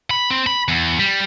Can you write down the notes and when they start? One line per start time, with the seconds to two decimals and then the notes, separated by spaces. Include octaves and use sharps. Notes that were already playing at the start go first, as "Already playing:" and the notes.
0.10 B5
0.30 C4
0.47 B5
0.68 E2
0.99 G3